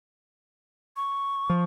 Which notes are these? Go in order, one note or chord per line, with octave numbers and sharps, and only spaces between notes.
C#6
F3